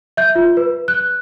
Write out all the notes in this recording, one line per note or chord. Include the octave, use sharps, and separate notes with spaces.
E5 G6
F4
B4
F#6